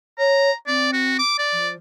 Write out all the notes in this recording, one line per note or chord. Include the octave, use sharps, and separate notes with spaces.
C#5 A#5
C4 D5
F#4
D6
D5
F3